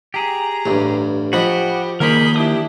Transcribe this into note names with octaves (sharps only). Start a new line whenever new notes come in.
G4 G#4 A#5
A1 G2
F3 F#4 G4 D#5 B5
D#3 A#3 G#4 A#4 C5 B5
D4 E4 G4 D#6